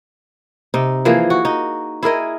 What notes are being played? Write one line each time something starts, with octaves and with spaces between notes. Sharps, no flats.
C3 D#4
E3 F3 A#3 G#4
F#4
D#4
E4 G#4 A#4 D#5